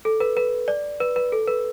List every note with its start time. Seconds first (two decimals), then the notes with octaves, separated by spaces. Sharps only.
0.05 A4
0.20 B4
0.37 B4
0.68 D5
1.00 B4
1.16 B4
1.32 A4
1.48 B4